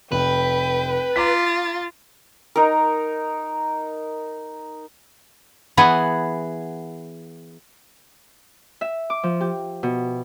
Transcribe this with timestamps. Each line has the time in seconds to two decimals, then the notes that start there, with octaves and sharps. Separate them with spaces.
0.12 F1 B4 G5
1.16 F4 A#5 D6 A6 B6
2.56 D#4 A#4
5.77 E3 B3 G#4 F#5
8.81 E5
9.10 D6
9.23 F3
9.41 G4
9.83 B2